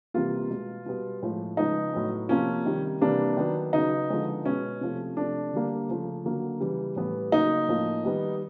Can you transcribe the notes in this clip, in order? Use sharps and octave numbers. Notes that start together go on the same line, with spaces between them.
C3 E3 G3 A#3 F4
B2 G#3 B3
B2 G3 B3
A2 F3 G#3
C#3 F3 G#3 B3 D#4
A2 F#3 B3
C3 F3 A#3 C#4
C3 D#3 G3
C3 E3 G3 A#3 D4
D#3 F#3 B3
C#3 F#3 B3 D#4
D3 F3 G#3 B3
B2 G#3 B3 C#4
C3 F3 A3
C3 F3 A3 D4
D3 G3 A#3
C#3 F3 A3
D3 F#3 A#3
C#3 E3 G3
A2 E3 G3 B3
C#3 F#3 A#3 D#4
A2 F3 A#3
D#3 G3 B3